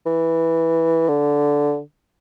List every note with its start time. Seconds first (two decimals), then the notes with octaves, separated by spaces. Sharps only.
0.06 E3
1.09 D3